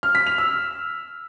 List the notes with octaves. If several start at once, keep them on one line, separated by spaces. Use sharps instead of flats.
F6
B6
F7
E6